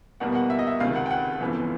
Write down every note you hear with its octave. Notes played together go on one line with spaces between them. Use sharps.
E2 B2 G3 A#3 F#5
F#5
E5
D#5
E5
C#2 C3 D#3 F5
F#5
G5
F#5
G1 F2 C#3 E3